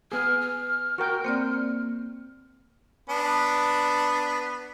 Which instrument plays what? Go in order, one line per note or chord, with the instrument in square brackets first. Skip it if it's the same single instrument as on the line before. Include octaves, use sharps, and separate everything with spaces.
[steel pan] B3 G#4 [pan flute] F6
[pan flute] F6
[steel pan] F#4 A#4 G5 [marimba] C#6
[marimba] A#3 C4 D5 [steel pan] C5
[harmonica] B3 D4